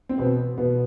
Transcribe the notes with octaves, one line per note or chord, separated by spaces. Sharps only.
C4
B2 B3
B2 B3